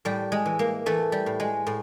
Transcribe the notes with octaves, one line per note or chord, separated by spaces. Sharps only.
A2 G3
G#3
E3
A#3
E3 A3
G3
A2
G#3
A2